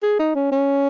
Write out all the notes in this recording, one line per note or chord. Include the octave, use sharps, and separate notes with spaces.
G#4
D#4
C#4
C#4